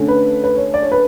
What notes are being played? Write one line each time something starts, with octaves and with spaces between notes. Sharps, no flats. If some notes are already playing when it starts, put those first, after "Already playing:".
Already playing: D3 A3 C#4
B4
B4
C#5
D5
C#5
B4